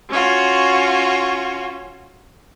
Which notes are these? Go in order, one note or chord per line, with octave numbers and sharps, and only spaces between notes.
C#4 F4 F#4